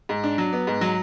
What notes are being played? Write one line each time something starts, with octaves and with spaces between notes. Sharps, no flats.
G#2
D4
F#3
B3
G#2
F#3